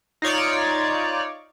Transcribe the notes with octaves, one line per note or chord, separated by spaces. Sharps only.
D#4 F4 C#5 D5